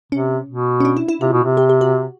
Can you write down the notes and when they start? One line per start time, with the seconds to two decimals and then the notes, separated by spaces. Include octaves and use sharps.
0.12 C3 C#4
0.49 B2
0.80 C#4
0.85 D4
0.97 E4
1.08 E4
1.21 C3 F4
1.32 B2
1.44 C3
1.57 G4
1.69 G4
1.81 F#4